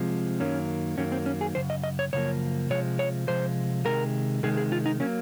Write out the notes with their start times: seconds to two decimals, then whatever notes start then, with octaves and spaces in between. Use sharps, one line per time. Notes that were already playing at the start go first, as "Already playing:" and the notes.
Already playing: C3 F3 G#3
0.40 F#2 D#3 F#3 A#3 C#4
0.97 F#2 D#3 F#3 A#3 C#4
1.12 C4
1.26 C#4
1.41 G#4
1.55 F#2 C#3 C5
1.70 D#5
1.84 D#5
1.99 C#5
2.13 F#2 C#3 F3 A#3 C#5
2.70 C3 F3 G#3 C#5
2.99 C#5
3.27 C3 F3 G#3 C5
3.85 C3 D#3 G#3 A#4
4.43 C3 D#3 G#3 G#4
4.57 G#4
4.72 F4
4.86 D#4
5.00 F#3 A#3 C#4